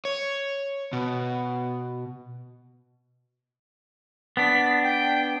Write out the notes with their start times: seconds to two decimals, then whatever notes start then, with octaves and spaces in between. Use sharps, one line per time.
0.05 C#5
0.93 B2
4.37 B3 D4 B6
4.83 G5